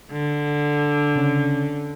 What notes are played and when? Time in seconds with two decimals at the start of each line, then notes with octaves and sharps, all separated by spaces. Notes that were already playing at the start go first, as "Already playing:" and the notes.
0.12 D3
1.15 C#3 C#4